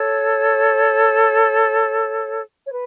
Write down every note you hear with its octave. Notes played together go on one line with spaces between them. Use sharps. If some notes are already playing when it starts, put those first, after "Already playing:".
Already playing: A4 C#5
C#5
B4